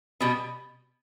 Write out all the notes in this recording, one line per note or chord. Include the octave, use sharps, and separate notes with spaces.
B2 G3 B3